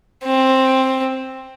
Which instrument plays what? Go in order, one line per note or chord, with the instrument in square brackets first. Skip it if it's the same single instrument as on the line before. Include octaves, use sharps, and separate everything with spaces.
[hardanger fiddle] C4